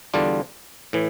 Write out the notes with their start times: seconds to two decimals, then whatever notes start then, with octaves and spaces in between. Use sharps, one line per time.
0.14 E2 D3 G3 D4 F4
0.93 A2 E3